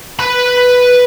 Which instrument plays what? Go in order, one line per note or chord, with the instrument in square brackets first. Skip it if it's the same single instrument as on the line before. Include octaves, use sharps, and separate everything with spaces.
[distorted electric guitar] B4 B5